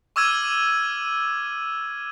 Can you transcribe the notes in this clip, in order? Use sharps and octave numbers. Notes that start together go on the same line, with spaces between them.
C#6 D6 E6 F6 G#6 D#7